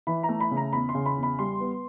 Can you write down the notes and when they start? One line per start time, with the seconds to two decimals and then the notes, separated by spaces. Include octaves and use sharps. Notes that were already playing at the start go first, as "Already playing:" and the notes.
0.07 E3 B5
0.23 A#5
0.29 A3
0.40 B5
0.51 C#3
0.57 A#5
0.73 E2 B5
0.89 C6
0.95 C#3
1.06 B5
1.17 E2
1.23 B5
1.39 G3 C6
1.60 B3